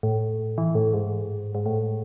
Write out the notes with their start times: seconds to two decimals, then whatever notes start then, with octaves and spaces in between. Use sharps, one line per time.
0.03 A2
0.58 E3
0.75 A2
0.94 G#2
1.55 G#2
1.66 A2